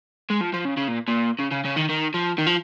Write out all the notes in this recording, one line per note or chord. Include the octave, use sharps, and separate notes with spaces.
G#3
F3
F3
C#3
C#3
A#2
A#2
C#3
C#3
C#3
D#3
D#3
F3
D#3
F3